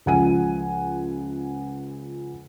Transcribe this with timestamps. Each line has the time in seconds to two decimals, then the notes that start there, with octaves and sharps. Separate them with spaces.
0.06 C#2 F3 F#5 G#5 D#7